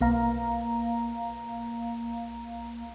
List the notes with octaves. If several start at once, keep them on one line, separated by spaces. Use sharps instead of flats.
B1 A#3 F5 A#5